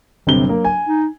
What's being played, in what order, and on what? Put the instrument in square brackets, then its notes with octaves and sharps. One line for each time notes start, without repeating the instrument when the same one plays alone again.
[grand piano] G1 C3 G7 [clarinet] F#3
[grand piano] A#3
G#5
[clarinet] D#4